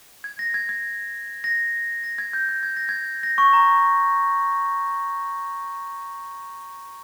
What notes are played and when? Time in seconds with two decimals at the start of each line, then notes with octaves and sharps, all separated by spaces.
0.24 G#6
0.39 A#6
0.54 G#6
0.69 G#6
1.44 A#6
2.04 A#6
2.18 G#6
2.33 G6
2.49 G6
2.63 G#6
2.77 A#6
2.89 G#6
3.23 A#6
3.38 C#6
3.53 A#5